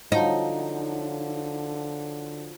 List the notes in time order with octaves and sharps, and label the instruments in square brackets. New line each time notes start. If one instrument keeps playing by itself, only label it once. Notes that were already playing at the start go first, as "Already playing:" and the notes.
[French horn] D3 [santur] F3 F#3 [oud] D#4